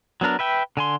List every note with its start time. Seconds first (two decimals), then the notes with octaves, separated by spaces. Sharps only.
0.21 F#3 B3 D4 A#4
0.39 B4 E5 G5
0.77 D3 G#5 C6